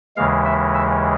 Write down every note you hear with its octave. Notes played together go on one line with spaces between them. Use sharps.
D#2 C#3 E3 G#3 F5
E5
E5